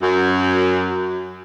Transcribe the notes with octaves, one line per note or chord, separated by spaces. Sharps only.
F#2